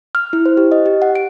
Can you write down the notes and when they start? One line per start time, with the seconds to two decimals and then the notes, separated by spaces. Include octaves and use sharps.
0.15 F6
0.33 E4
0.46 C5
0.57 G4
0.72 D#5
0.86 G4
1.02 F#5
1.15 D7